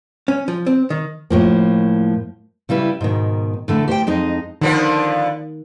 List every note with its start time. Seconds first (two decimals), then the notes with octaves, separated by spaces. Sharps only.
0.28 C#4
0.48 F3
0.67 C4
0.90 D#3
1.30 A2 F3 A#3
2.69 C#3 G3 E4 B4
3.01 G#2 B2 D#3
3.68 A2 D3 A3
3.88 G4 C5 C#5 G5
4.07 F2 G#3 D#4 D#5
4.61 D3 D#3 F3 B3